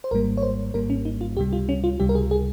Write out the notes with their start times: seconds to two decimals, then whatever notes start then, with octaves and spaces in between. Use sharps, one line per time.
0.04 C5
0.11 G#1 G#2 G3 A#3 A#4
0.37 C#5
0.43 C5
0.74 G#1 G#2 G3 A#3 A#4
0.90 C#4
1.05 D#4
1.21 F4
1.37 C#2 C3 G3 G4
1.53 F4
1.69 C#4
1.84 F4
2.00 C#2 C3 G3 G4
2.09 A#4
2.15 G#4
2.31 G#4